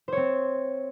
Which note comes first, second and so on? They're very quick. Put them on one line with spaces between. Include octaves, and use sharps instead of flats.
C5 C#5 C4